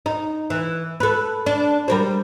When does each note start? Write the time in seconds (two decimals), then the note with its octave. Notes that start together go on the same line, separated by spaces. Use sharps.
0.06 D#4
0.50 E3
1.00 A4 B4
1.46 D4
1.88 G3 A#4 C5